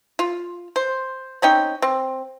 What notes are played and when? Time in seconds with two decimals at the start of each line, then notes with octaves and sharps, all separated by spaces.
0.19 F4
0.76 C5
1.42 C4 C#4 D#4 G5
1.82 C4